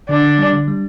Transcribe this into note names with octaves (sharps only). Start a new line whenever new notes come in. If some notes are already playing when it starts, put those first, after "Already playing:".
D3 D4
D3
G3
D3
G3